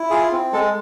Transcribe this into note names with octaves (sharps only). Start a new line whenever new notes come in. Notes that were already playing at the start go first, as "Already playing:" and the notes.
Already playing: E4
F4 G#4
C4
G#3 A4